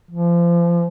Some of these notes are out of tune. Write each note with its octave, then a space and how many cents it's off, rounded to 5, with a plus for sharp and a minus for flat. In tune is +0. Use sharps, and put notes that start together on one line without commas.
F3 -30